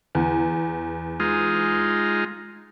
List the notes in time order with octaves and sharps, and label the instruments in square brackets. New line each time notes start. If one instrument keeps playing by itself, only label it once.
[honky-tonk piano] E2
[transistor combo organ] G#3 D#4 F4